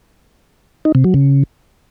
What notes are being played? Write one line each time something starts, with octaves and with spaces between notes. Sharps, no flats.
D#4
C3
F#3
C#3